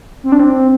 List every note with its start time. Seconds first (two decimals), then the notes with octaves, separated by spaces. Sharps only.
0.24 C4
0.32 D4
0.39 C4